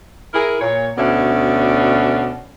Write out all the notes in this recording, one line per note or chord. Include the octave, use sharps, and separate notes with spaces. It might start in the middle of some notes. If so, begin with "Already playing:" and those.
E4 G#4 A#4
A#2 C#5
D2 B2 C#4 D5 E5